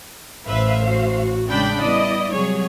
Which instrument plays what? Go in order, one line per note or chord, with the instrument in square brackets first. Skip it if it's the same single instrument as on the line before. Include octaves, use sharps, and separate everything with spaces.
[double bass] A1 [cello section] A2 C5 F5 [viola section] B4 E5
[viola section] F#4
[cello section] C#3 G#3 [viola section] D4 G5 B5
[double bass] G3 B3 [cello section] E4 D5 [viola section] D#5
[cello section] C3 F#3 [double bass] G3 [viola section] G#4 C#5